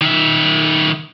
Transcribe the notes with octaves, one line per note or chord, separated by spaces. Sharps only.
D#3 E5